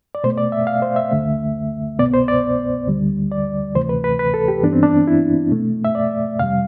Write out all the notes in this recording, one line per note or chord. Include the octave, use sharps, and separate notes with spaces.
D5
B2 A3 C5
D5
E5
F5
C5
E5
D2 D3 A3
C2 B2 B3 D5
C5
D5
D2 D3 G3
D5
D2 C3 E3 A3 C5
B4
B4
B4
A4
G4
G2 E3 B3 D4
C4
D4
E4
B2 A3
E5
D5
F2 C3 G3 F5